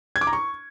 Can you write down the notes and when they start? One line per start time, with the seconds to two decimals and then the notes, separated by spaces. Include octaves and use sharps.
0.16 G#6
0.21 D6
0.27 A#5
0.33 C#6